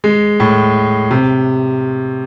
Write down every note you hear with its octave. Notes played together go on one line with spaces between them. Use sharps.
G#3
A2
C3